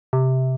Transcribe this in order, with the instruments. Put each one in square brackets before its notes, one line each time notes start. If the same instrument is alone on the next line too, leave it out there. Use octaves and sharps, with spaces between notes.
[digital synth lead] C3